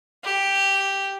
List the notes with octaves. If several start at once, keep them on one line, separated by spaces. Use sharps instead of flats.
G4